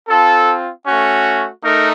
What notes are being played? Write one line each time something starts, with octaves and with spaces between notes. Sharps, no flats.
C4 F4 A4
A3 C#4 F#4
A3 D#4 A#4